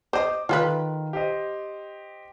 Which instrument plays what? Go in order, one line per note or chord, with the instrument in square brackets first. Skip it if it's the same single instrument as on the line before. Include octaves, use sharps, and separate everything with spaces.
[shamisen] C5 D#5 [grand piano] D6
[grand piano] D#3 [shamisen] F4 A4 B4
[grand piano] G4 C5 D#5